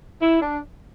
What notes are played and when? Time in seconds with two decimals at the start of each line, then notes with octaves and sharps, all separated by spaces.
0.20 E4
0.40 D4